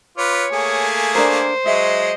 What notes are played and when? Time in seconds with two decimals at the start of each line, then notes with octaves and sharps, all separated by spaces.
0.18 F4 B4 C#5 D6
0.53 A3 A#3 G#4 G#5
1.15 D4 A#4 C5
1.66 F#3 G#3 D#5 E5